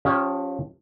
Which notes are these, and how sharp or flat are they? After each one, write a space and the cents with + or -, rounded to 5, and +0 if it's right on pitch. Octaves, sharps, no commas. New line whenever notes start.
F3 +25 C#4 +0 G4 +0